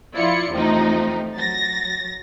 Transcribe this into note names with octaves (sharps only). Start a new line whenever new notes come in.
F3 E4 F4 D5 C#7
E2 C3 F3 A3 D#4
F#3 A6 A#6